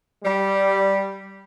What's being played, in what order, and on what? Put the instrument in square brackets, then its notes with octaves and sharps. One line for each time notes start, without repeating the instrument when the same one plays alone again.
[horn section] G3